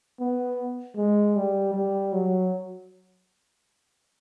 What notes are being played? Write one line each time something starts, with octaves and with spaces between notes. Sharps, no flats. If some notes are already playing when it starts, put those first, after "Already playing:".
B3
G#3
G3
G3
F#3